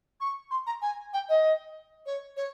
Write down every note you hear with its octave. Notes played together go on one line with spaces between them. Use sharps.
C#6
C6
A#5
G#5
G5
D#5
C#5
C#5